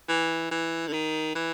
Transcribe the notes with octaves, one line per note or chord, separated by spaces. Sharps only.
E3
E3
D3
D#3
E3